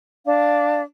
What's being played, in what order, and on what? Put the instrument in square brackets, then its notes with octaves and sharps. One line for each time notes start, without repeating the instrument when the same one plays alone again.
[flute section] D4 F5